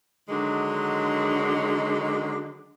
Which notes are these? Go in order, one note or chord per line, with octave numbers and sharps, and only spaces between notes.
D3 D#3 F#3 G#3 D4